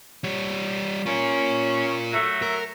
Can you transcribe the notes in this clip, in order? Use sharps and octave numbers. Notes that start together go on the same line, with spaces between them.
G3 C#5
C#4 F4 A#4
F#3 A3
A#4